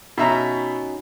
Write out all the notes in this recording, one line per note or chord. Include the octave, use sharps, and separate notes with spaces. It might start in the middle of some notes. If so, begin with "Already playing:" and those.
B2 C#4 D#4 F#4 E5 A#5